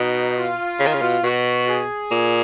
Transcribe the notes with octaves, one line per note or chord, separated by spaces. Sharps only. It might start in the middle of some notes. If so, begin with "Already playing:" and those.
Already playing: B2 D#4
F4
C#3
D#3
C#3
B2
B2 F#4
G#4
A#2